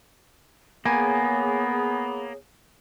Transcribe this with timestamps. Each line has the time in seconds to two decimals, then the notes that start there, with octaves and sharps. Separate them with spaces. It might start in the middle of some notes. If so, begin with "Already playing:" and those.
0.85 A#3 B3 G#4 C#5 G#5